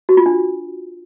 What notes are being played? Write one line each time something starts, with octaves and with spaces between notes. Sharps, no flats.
F#4
F4
D4